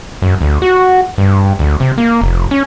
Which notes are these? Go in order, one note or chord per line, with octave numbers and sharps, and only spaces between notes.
F#2
D2
F#4
G2
D2
C3
A#3
F1
C#4